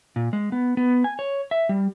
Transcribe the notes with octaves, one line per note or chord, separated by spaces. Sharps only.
A#2
G#3
B3
B3
G#5
C#5
E5
G3